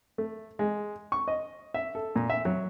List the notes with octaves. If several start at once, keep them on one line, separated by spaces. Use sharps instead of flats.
A3
G#3
C#6
D#5
E5
A4
A#2
E5
F#3